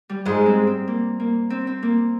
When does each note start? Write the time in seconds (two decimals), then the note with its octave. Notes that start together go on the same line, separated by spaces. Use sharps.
0.09 G3
0.26 G#2 G#3
0.46 C4
0.67 C4
0.88 A#3
1.20 A#3
1.50 C4
1.67 C4
1.83 A#3